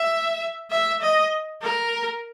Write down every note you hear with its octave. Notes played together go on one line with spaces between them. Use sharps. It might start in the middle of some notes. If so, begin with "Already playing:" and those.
Already playing: E5
E5
D#5
A#4